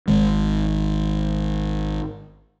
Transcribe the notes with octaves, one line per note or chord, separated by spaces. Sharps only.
G#1 D#3 G#3